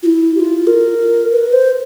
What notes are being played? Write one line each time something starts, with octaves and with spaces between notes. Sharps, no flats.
F4
E4
G4
F4
A#4
B4
C5